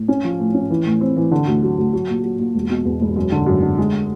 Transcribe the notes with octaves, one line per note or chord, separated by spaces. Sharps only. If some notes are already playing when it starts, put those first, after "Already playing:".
Already playing: A2
C#4
F3
A2
C#4
E3
A2
C4
E3
D3
D2
F#3
D2
F#3
A#2
F#3
A#2
E1
B2
E2
E1
F#2
D3
F#2
D3
G#3